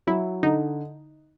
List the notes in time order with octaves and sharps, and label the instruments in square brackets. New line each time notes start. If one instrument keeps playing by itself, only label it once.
[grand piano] F#3 [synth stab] E4
[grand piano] D3 [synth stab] D#4